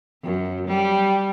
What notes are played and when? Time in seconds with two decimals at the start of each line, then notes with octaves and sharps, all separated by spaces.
0.23 F#2
0.67 G3